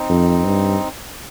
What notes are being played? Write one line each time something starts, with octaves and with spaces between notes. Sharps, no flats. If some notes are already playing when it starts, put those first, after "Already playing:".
Already playing: C4 D#4
F2
G2